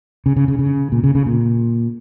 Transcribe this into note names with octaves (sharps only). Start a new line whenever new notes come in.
C#3
C#3
C#3
C#3
A#2
C#3
C#3
A#2